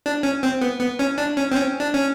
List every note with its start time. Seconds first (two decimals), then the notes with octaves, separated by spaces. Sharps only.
0.06 D4
0.23 C#4
0.43 C4
0.61 B3
0.80 B3
0.99 C#4
1.18 D4
1.37 C#4
1.52 C4
1.55 C#4
1.80 D4
1.94 C#4